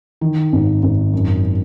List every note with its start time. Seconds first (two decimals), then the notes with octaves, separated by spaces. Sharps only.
0.21 D#3
0.53 G#1
0.83 G#1
1.13 F#2